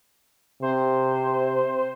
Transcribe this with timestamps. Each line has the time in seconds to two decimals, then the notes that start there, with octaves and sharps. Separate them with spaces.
0.62 C3 C5